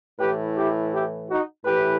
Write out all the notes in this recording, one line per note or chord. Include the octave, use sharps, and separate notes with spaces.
A2 E3 G4 B4
E4 G4
E4 G4
D#4 F#4
A2 E3 G4 B4